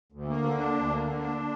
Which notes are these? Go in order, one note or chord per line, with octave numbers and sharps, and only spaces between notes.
D2
A#3
D3
D4
D2
A#3
D3
D4